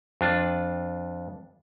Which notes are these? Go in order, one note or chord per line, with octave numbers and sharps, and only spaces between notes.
F2 D4 F4